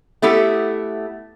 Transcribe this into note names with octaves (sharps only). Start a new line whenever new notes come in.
A3 B3 E4 G4 A4